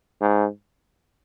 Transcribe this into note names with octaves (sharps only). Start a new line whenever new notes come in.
G#2